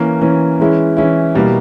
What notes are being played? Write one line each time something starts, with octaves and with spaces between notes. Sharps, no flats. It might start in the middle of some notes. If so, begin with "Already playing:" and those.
Already playing: E3 A#3 C#4
E3 A#3 C#4
E3 G#3 C#4 E4
E3 G#3 C#4 E4
B2 G3 A#3 E4